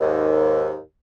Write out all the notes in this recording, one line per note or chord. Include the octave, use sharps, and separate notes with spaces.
D#2 G#2